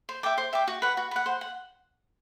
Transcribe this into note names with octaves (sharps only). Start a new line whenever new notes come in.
C5
E5 G5 D6
C5
E5 G5 D6
F#4
B4 F#5
F#4
B4 F#5
C5
F#5